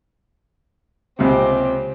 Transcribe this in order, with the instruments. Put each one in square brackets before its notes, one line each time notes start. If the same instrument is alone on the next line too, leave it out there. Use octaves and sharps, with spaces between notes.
[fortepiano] C#2 C3 [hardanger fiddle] C4 G4